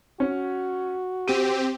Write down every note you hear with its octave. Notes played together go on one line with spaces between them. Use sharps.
C#4 F#4
C4 G4 D#7